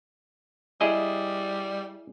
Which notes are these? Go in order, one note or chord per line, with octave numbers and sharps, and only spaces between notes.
G3 E4 G#4 D#5